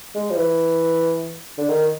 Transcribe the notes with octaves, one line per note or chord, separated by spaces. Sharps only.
G#3
F3
E3
D3
D#3